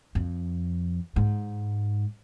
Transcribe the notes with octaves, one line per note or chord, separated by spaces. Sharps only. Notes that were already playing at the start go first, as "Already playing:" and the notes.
F2
G#2